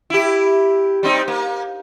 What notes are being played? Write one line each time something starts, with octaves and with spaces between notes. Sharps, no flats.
E4 G4
G3 C4 D#4
A#3